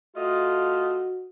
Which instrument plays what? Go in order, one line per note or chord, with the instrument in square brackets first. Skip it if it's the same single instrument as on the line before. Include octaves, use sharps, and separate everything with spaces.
[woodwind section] A3 F4 [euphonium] F#4 [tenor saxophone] D#5